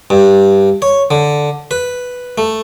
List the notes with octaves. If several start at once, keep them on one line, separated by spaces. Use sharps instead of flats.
G2
C#5
D3
B4
A3